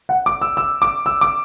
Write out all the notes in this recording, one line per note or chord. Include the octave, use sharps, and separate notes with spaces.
F#5
D6
E6
E6
D6
E6
D6